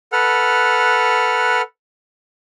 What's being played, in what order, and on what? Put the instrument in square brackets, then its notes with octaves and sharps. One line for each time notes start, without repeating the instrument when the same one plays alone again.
[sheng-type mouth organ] A4 B4 F#5 F6